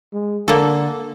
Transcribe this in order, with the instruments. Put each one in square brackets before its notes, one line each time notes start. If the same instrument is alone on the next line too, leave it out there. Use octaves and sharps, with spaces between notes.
[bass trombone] G#3
[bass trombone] D3 [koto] A#3 A4